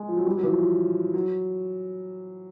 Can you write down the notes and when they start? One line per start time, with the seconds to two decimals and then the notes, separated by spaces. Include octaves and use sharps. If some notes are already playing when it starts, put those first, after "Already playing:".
Already playing: G#3
0.08 F3
0.17 F#3
0.26 G3
0.37 F#3
0.43 E3
0.48 F3
0.59 F3
1.14 F#3